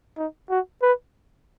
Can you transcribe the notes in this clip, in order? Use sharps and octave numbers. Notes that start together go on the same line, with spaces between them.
D#4
F#4
B4